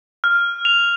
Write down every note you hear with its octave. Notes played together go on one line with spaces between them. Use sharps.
F6
F7